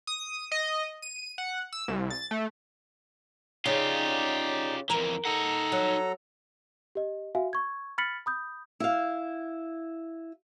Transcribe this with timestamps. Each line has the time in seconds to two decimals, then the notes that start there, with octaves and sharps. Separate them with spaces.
0.07 D#6
0.52 D#5
1.02 D#7
1.38 F#5
1.73 E6
1.88 C2
2.10 A6
2.31 A3
3.66 C#3 D#4 F4 G4 D5
4.90 F2 E3 A#4
5.25 D#4 A4 F#5 A#5
5.72 F#3
6.95 G4 D#5
7.35 F#4 E5 F5 G#5
7.53 C#6 G#6
7.98 B5 F6 A6 B6 C#7 F#7
8.26 B5 D#6 G6
8.80 E4 F5